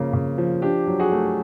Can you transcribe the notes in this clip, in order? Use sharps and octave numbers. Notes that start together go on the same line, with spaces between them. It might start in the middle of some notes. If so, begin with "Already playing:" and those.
Already playing: C#3 F3 A#3
C#3
F3
D4 G4
F#3
F#4 G#4
A3